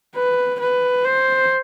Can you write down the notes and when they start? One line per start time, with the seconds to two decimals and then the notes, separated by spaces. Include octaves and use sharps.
0.15 B4
0.60 B4
1.05 C5